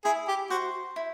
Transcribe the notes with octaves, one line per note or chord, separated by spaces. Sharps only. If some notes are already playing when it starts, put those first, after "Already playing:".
E4 G#4
G4
F#4 C5
E4